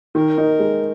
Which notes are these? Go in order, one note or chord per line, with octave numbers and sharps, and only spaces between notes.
D#3 A#4
D#4
G#3